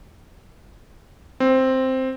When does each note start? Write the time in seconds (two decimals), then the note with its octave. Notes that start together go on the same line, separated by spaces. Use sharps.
1.40 C4